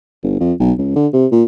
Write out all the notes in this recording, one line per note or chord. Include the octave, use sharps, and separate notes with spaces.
G1
F2
B1
C#2
D3
C3
A#2